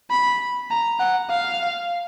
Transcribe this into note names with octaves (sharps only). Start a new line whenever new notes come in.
B5
A#5
F#5
F5